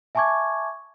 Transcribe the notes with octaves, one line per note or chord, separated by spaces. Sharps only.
E5 G#5 A5 C#6 D6 G#6